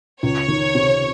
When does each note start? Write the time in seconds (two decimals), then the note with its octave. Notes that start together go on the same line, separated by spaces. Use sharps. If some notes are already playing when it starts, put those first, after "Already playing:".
0.23 C#2 C#5
0.48 D#3
0.75 C3